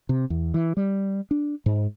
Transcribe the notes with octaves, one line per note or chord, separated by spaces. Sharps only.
C3
E2
E3
G3
D4
G#2